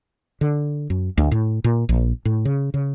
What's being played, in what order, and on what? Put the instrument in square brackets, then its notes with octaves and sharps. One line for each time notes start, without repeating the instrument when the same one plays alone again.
[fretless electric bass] D3
F#2
D2
A2
A#2
A#1
A2
C#3
C#3